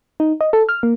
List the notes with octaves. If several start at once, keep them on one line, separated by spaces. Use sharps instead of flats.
D#4
D#5
A4
F6
A#3